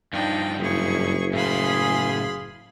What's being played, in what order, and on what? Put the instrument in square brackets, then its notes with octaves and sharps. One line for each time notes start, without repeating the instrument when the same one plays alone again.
[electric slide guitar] G2 F3 [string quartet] D4 D#4 G5
[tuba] F#1 [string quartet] E4 G#4 C#6
[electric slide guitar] A2 C#3 [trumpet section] G#4 [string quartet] F5 B5 C6